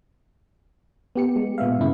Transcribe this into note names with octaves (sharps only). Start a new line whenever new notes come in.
B3 G4 C#7
G#3
A#2 B3 E5 F5
G2 C#3 E4